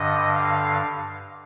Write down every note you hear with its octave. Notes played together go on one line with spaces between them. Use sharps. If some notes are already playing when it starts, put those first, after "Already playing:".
Already playing: G2 D3 D#5
F5